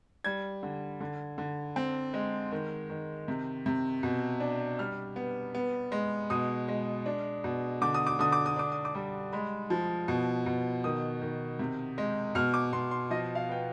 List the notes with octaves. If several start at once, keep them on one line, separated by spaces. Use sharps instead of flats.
G3 G#6
D3
D3
D3
C4
G#3
D#3
D#3
C3
C3
B2
D4
G3 F6
B3
B3
G#3
B2 D#6
G#3
D4
B2
D3 D6
D#6
D6
D3 D#6
D6
D#6
D4 D6
D#6
D6
G3
G#3 B5
F3
B2
B2
D#3 D#6
D#3
C3
G#3
B2 F6
D6
B2 C6
C6
F3 D#5
F5
B3 G5